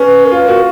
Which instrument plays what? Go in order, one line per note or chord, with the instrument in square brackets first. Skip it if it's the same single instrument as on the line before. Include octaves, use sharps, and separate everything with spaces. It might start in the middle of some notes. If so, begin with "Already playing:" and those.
Already playing: [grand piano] C#4 [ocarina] B4
[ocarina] A#4
[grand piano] F4 [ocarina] B4
[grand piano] F#4 [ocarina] A#4